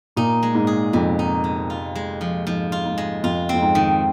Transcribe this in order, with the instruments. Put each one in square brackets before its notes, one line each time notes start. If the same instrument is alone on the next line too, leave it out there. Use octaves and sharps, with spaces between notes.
[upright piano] A#2 [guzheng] D#4
[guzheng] G#3
[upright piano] G#2
[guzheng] G#4
[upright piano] F2 [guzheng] C3
[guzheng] D#4
G#3
F4
G#3
F3
[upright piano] G#2 [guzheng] F3
[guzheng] F4
[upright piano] G#2
[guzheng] G#3
[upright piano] F2 [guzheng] F4
[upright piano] F2 [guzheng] C4
[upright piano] G#2
[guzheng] D#3